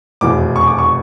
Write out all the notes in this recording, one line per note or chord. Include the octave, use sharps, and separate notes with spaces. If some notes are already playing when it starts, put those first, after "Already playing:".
F1 E2 B2 D6
C#6
D6
C#6